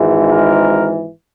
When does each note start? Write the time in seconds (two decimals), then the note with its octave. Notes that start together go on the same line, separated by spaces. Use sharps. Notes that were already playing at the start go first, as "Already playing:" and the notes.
Already playing: G#1 G#2 E3
0.30 A#4